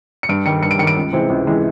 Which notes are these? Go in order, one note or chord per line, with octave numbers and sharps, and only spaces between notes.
C#7
G2 D7
D#3 G3 C#7
G2 C#7
D7
D#3 G3 C#7 D7
C#2
C3 E3 G#3 C4
C#2
C3 E3 G#3 C4